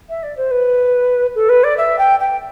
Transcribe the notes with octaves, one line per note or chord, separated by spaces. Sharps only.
E5
D5
C5
B4
A4
B4
D5
E5
G5
G5